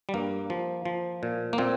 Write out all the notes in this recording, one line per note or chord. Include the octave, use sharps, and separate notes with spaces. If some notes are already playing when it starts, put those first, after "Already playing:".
G3
G2 A#3
F3
F3
A#2
A#3
A#2 C4